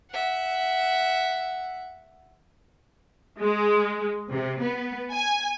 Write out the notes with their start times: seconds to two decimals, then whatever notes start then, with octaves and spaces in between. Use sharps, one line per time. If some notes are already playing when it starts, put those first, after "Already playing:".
0.11 E5 F#5
3.40 G#3
4.30 C3
4.63 B3
5.12 G#5